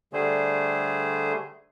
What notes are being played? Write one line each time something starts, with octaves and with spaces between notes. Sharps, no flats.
D3 G3 A3 G#4 C5